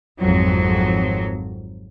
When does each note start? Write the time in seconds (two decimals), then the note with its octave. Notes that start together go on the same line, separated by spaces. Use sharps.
0.18 G#1 F2 F#3